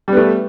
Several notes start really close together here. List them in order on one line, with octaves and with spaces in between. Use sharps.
G3 B3 A3